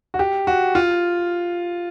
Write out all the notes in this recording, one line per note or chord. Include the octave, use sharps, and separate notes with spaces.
F#4
G4
F#4
F4